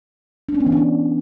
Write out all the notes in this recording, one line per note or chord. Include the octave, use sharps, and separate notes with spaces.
D4
C#4
B3
E3
D4